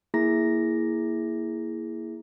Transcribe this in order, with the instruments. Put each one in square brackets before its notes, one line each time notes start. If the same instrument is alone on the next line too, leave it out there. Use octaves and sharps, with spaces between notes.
[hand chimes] A#3 E4 G#4 A#5 A#6